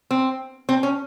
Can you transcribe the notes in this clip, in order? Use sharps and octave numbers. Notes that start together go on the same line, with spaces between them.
C4
C4
C#4